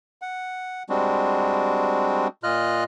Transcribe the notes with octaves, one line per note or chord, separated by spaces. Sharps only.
F#5
G3 G#3 C4 D4 F#4
A#2 F4 D#5 F6 F#6